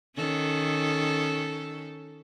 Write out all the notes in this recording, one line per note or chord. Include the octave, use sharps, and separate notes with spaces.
D#3 C#4 A4